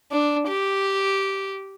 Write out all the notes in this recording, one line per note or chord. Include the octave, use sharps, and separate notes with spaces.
D4
G4